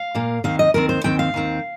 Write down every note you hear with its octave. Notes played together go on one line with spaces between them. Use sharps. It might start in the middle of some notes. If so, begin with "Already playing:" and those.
Already playing: F5
A#2 A#3
D#2 D#3 C4 F5
D#5
D#2 D#3 C4 A#4
C5
D#2 D#3 C4 G5
F5
D#2 D#3 C4